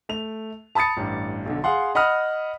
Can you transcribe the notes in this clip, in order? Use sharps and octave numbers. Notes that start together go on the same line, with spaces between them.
A3 F7
A5 B5 D#6 A6 C#7
A1 G2
B1 D3
G#4 F5 F#5 C6
D#5 F#5 B5 D#6 F6